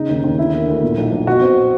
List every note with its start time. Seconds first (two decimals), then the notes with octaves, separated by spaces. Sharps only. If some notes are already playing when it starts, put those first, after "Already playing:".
Already playing: C#3 D#4
0.09 D#2
0.24 D#2
0.38 D3 E4
0.53 A#3
0.67 D2
0.83 A#2
0.98 B1
1.12 B1
1.27 B2 F#4
1.42 C4